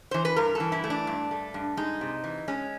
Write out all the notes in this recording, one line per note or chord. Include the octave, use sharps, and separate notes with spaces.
E3 C5
B4
G2 A#4
E3 A4
E4
A3
D4
G2
A3
G2
G#3 D#4
C3
E3
G#3 C#4